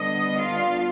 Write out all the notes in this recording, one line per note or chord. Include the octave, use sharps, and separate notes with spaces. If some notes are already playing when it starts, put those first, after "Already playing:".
Already playing: D3 G3 B3 D#5
F4